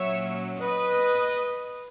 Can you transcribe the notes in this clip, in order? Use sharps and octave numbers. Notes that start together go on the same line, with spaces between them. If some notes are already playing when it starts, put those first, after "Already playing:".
Already playing: A#2 F#3 C#4 C#5 E5
B4 D#5